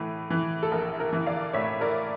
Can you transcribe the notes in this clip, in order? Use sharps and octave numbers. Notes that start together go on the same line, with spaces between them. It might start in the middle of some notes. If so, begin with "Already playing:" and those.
Already playing: A2 E3
E3
A4
A#1 A#4
A#4
E3
D5 F5
A2 C#5 E5
A#4 D5